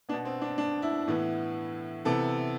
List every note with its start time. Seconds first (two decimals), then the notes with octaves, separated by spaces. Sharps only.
0.09 B3 D4
0.13 B2
0.25 C4
0.42 D4
0.58 D4
0.82 E4
1.08 A2 E3 B3
2.05 C3 E3 B3 A4